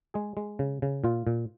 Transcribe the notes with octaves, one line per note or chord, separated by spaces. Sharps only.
G#3 G#4
G#3
C#3
C#3
A#2 F4
A#2